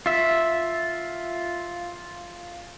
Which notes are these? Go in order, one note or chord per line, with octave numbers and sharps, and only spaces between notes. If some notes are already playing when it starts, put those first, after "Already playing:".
F4 E5